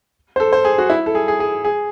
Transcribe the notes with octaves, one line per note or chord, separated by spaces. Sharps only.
C5
A4
C5
G#4
F#4
E4
A4
G#4
G#4
G#4
G#4